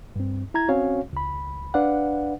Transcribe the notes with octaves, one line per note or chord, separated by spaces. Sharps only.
G2 C4
E4 A#5 G#6
C4 C#4 F#4 C#5 F5 G#5
C#2 B5
D4 B4 D5 F5 F#5